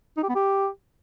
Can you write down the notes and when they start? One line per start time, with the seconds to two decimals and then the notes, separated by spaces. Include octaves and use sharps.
0.17 D#4
0.23 G4
0.29 B3
0.35 G4